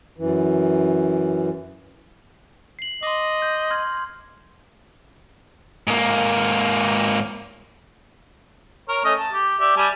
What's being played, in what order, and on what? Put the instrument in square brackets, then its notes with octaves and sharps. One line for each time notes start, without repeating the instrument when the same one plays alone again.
[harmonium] F#2 E3
[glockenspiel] C7 F#7
[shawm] D#5 [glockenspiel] C6 D6
[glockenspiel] G6
C6 F6 G#6
[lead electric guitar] G#2 A#3
[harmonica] A#4 C#5
A3 C#4 D#5
A5
G4
G4 D5 E5
G3 G#5 A5